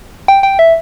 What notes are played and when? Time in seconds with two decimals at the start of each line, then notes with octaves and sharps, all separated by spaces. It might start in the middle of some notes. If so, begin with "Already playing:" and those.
0.28 G5
0.43 G5
0.59 E5